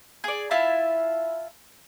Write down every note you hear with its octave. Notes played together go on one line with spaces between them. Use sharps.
G#4 D5
E4 F4 E5 A5